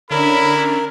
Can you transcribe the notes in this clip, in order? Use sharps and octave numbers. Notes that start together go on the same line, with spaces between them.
D3 C#4 D4 E4 A#4 B5